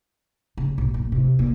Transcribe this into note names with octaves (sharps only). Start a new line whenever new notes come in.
C#3
B1
A#2
C3
A#2